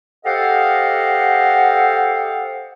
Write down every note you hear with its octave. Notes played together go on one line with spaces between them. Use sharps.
G4 A4 C5 D#5 F5 F#5